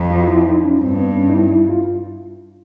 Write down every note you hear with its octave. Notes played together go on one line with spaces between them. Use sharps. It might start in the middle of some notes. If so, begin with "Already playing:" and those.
Already playing: F2
F4
F4
E4
D#4
C#4
G2 C4
B3
C#4
D#4
E4
E4
F4